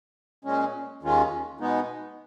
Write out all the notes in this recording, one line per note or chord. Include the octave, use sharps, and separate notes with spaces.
A#2 G#3 C#4
D#2 D#3 G#3 C#4 F4
B2 G#3 B3 D#4